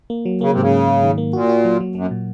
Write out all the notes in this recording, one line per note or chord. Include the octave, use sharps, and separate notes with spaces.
A#3
F#3
C#3 A#3
C3
G#2 C#3
G#2
G#2
D#3
A#3
A#2 F#4
F#4
F#3
F#3
F#2 F#3
A#2